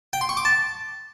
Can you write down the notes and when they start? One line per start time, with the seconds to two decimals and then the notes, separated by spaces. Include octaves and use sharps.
0.13 G5
0.21 C6
0.29 C#6
0.37 D6
0.45 A5